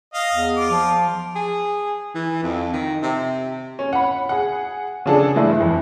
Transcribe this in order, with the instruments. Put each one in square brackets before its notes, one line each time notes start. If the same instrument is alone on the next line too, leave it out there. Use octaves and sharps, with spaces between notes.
[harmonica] D#5 F5
[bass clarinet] E2
[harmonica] F4 D6
[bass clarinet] F3
[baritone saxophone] G#4
E3
F2
D#3
C3
[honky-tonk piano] C#4
F#5 B5
G#4 F#5
C#3 F3 D4 G#4 A4
G2 E3 G#3 A3 D4 E4
F2 E3